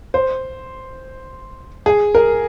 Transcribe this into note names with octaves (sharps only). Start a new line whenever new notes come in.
C5
G#4
A#4